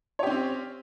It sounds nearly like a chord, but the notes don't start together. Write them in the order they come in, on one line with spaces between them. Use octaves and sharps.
C#5 G4 C#4 C4